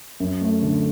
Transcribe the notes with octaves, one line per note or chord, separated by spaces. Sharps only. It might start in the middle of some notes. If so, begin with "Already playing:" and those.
F#2
A3
D3